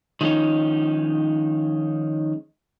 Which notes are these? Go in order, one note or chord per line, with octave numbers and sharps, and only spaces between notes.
D#3 F3 G#3 C#4 D#4